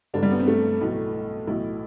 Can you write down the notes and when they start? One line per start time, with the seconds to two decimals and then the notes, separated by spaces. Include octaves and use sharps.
0.14 G1 G2 D3 D4
0.23 G3
0.31 B3
0.40 C4
0.48 A3
0.81 B1 A2 E3
1.47 B1 A2 E3 E4